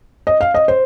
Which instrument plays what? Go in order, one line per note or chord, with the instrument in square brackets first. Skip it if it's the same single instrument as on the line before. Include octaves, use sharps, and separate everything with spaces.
[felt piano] D#5
F5
D#5
C5